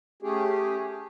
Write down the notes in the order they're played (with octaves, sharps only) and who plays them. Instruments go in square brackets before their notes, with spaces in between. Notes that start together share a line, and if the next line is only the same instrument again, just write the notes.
[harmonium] A3 C#4 G4 G#4